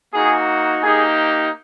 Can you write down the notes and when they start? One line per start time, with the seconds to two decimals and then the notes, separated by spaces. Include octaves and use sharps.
0.12 A#3 D#4 F#4 G#4
0.82 A#3 D#4 G4 G#4